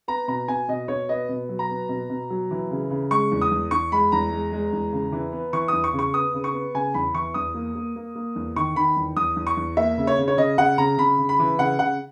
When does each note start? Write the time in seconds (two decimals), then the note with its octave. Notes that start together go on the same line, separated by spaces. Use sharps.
0.08 B3 A#5
0.28 B2 A#5
0.48 B2 G#5
0.68 B2 D#5
0.88 B2 C#5
1.09 B3 D#5
1.29 B2
1.49 F#3
1.59 A#5
1.70 B3
1.89 B2
2.10 B2
2.30 F#3
2.51 E3
2.71 C#3
2.90 C#3
3.11 G#3 C#6
3.32 E2
3.41 D#6
3.51 E2
3.71 E2 C#6
3.92 G#3 B5
4.12 E2 A#5
4.31 G#3
4.52 G#3
4.73 E2
4.93 C#3
5.12 E3
5.32 B3
5.53 E3 C#6
5.68 E2 D#6
5.84 C#6
5.93 C#3
5.99 C#6
6.14 B3 D#6
6.34 C#3
6.44 C#6
6.53 B3
6.74 C#3 G#5
6.94 E2 B5
7.15 E3 C#6
7.34 E2 D#6
7.54 A#3
7.75 A#3
7.96 A#3
8.15 A#3
8.36 E2
8.56 D#3 C#6
8.76 D#3 B5
8.96 E2
9.17 E2 D#6
9.36 E2
9.47 C#6
9.57 E2
9.77 A#3 E5
9.97 C#3
10.07 C#5
10.18 C#3
10.28 C#5
10.37 C#3 D#5
10.58 C#3 F#5
10.78 C#3 A#5
10.98 C#3 B5
11.18 C#3
11.29 B5
11.39 E3
11.59 C#3 F#5
11.79 C#3 F#5